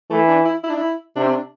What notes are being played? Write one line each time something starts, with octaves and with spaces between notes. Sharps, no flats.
E3 A3
D4
E4
E4
D4
E4
C3 D4
C4
D4